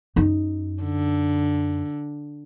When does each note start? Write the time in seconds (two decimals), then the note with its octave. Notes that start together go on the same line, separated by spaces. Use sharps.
0.16 F#2 D#4
0.83 D3